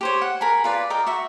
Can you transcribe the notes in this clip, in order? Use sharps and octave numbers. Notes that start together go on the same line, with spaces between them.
G4 C5 C#5
F#5
A#4 G#5 B5
F4 B4 D5
A#4 D#5 G5 D6
F#4 E5 C#6